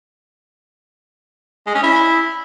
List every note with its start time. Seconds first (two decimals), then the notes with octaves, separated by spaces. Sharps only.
1.67 G#3
1.75 C#4
1.83 E4